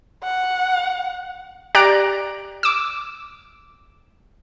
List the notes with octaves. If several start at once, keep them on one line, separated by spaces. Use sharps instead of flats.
F#5
G4 D5 A#5 F#6 D7
D6 E6